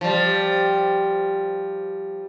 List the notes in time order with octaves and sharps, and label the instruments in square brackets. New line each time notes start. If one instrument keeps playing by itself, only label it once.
[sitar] F3 G3